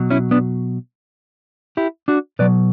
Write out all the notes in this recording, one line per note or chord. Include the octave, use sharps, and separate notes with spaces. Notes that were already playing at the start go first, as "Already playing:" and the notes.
Already playing: B2 F#3
C#4 E4
B3 D4
E4 G4
D4 F#4
B2 F#3 B4 D5